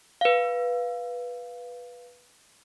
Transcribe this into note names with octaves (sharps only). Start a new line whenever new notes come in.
B4 F5